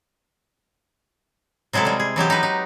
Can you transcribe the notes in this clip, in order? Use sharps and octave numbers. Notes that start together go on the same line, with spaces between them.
C3 F#3 G#3 E4 A4
G3 G#3
G#4
E3 F#3 G#3 G4
D#4 B4
D#4